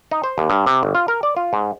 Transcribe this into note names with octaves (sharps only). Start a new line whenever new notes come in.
D#4
C5
D#2
G2
C3
G1
F4
A#4
D5
F4
G#2